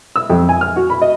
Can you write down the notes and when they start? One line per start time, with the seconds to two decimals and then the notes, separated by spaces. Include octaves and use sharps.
0.16 E6
0.30 F2
0.49 G#5
0.61 F6
0.76 F#4
0.90 B5
1.02 D#5